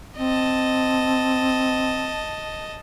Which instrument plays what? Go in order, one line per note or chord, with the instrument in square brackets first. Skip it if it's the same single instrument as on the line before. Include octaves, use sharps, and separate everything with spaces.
[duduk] C4 [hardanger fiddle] D#5 A5